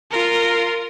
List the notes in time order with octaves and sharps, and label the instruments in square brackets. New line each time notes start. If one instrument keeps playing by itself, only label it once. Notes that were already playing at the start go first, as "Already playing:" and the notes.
[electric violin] F4 A#4